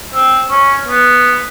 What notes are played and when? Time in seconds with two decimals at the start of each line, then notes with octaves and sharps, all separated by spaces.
0.14 C4
0.51 C#4
0.87 B3